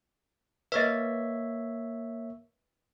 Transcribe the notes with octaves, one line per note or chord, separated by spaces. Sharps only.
A#3 B4 C#5 D#5 E5